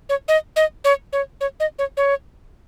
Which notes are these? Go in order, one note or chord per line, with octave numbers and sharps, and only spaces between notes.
C#5
D#5
D#5
C#5
C#5
C#5
D#5
C#5
C#5